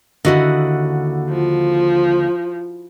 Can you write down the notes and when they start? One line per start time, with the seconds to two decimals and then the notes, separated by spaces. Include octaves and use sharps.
0.25 D#2 G#2 D3 E4 F#4 D#5
1.29 F3